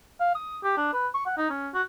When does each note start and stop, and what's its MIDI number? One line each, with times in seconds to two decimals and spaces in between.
0.20 0.34 77
0.35 0.58 87
0.63 0.76 67
0.77 0.90 62
0.93 1.08 71
1.14 1.23 85
1.26 1.35 78
1.37 1.50 63
1.50 1.69 61
1.74 1.82 66